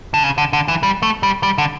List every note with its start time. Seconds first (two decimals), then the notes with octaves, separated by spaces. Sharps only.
0.14 D3
0.24 C#3
0.38 D3
0.53 D3
0.68 E3
0.83 G3
1.03 A3
1.23 G3
1.43 G3
1.58 D3